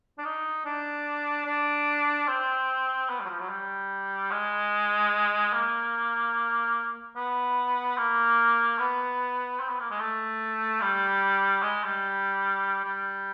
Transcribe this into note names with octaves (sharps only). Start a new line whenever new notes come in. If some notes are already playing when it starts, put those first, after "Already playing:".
D4
D#4
D4
D4
C4
B3
G3
F#3
F3
F#3
G3
G#3
A#3
B3
A#3
B3
C4
B3
A#3
G#3
A3
G3
G#3
G3
G3